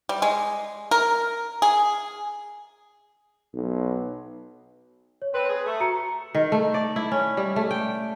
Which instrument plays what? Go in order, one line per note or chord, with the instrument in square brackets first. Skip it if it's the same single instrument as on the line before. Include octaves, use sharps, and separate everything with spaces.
[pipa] G3
G#3
A#4
G#4
[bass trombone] B1
[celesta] C#5
[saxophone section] C4 B4 [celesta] C6
[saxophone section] G#4
A3
[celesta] F#4 A#5 C#7
[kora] D#3
A3
D5
E4
C#4
G3
A3
G5